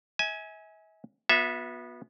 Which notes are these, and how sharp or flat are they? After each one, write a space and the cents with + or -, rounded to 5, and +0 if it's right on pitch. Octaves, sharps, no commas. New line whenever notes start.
E5 -40 G#5 +5
B3 -20 F#4 -45 E5 +0